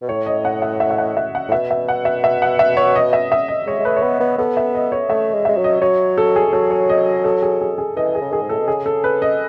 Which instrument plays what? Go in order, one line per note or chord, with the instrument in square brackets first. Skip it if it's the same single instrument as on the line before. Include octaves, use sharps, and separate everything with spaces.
[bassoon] B2
[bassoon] A2 [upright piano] C#5
[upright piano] D#5
F#5
E5
E5
E5
F#5
E5
F#5
[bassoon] A2
[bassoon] B2 [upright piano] E5
[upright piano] E5
F#5
E5
E5
F#5
E5
C#5
D#5
E5
E5
D#5
[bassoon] G#3 [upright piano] C#5
[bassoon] G#3
[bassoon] A3 [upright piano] B4
[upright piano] C#5
[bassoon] B3 [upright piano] B4
[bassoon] B3
[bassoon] B3 [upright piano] A4
[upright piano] E5
D#5
C#5
[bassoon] A3 [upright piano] E5
[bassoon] G#3
[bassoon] G#3 [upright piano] E5
[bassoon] F#3
[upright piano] D#5
[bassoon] F#3 [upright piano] C#5
[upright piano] A4
G#4
[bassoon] F#3 [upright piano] A4
[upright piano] C#5
D#5
A4
G#4
G#4
G#4
[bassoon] E3 [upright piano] D#5
[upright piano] G#4
[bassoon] C#3
[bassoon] D#3 [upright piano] G#4
[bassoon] G#2
[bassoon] A2 [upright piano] A4
[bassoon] B2
[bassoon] C#3 [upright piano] G#4
[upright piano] A4
B4
D#5